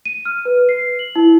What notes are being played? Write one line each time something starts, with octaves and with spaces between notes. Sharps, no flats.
D#7
F6
B4
C7
F#7
E4